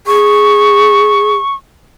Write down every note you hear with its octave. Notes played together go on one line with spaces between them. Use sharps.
G#4 C#6